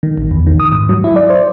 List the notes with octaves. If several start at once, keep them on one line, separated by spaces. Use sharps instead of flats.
D#3
A1
E2
D#3
D#6
G#2
F#3
E4
D5
C5